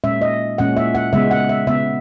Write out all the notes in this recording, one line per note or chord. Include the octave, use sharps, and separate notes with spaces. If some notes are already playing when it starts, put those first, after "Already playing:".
A#2 G#3 C#4 E5
D#5
A#2 G#3 C#4 F#5
E5
F#5
C#3 G#3 B3 E5
F#5
E5
C#3 G#3 B3 E5